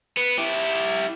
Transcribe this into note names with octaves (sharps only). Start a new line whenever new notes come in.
B3
E4 G4